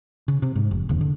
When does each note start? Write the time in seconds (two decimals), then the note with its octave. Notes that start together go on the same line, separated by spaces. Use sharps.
0.28 C#3
0.42 C3
0.55 G#2
0.71 F1
0.89 F1 D#2 C#3
1.01 D3